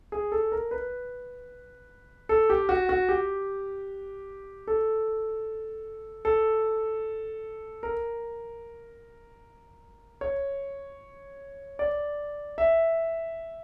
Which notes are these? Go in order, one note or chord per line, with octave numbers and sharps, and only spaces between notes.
G#4
A4
A#4
B4
A4
G4
F#4
F#4
G4
A4
A4
A#4
C#5
D5
E5